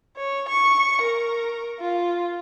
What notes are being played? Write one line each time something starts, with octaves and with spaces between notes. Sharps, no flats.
C#5
C#6
A#4
F4